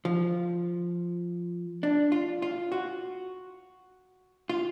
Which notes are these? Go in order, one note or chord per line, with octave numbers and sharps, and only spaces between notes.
F3
D4
F4
F4
F#4
F4